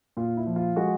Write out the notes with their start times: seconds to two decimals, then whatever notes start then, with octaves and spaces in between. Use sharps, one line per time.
0.17 A#2 F4
0.37 E4
0.47 F3
0.56 F4
0.76 G#3 F#4